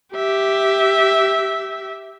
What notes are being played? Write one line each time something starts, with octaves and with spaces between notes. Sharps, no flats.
G4 E5